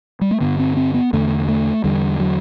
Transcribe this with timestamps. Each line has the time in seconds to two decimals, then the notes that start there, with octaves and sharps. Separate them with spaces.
0.21 G3
0.31 A3
0.41 G2 D3 B3
0.59 C4
0.77 C4
0.94 B3
1.13 E2 D3 A3
1.49 A3
1.84 E2 D3 G3
2.20 F#3